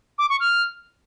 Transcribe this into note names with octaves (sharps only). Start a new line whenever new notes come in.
D6
C#6
F6